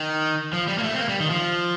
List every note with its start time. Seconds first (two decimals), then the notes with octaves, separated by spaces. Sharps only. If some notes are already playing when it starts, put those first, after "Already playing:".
Already playing: D#3
0.53 F3
0.68 G3
0.78 A#3
0.83 A3
0.94 C4
0.98 A#3
1.09 G3
1.20 D#3
1.30 F3